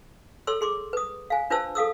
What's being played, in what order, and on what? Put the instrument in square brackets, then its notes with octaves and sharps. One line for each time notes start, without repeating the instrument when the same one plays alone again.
[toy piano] A4 C#5 C6 E6
G#4 C6 D6
B4 D#6
F5 G#5
D4 F4 B4 C5 A5 E6
A4 F5 D#6 E6